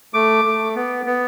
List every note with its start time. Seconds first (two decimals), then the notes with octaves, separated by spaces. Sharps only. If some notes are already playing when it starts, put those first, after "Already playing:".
0.14 A3 D6
0.45 A3
0.75 B3
1.06 B3